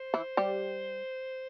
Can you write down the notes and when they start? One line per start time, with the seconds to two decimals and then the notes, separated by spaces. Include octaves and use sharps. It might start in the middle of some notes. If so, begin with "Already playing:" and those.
Already playing: C5
0.14 E3 E4
0.37 G3 G4